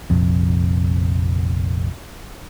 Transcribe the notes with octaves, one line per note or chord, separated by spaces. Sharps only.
F1 A#1 F2